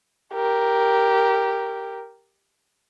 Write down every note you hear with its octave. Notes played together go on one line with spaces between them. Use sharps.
G4 A#4